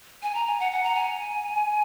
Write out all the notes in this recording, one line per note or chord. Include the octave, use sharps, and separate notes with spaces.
G#5
A#5
G#5
F#5
F#5
A#5
G#5